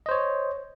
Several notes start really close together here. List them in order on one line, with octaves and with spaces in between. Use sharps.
D#5 C5 C#5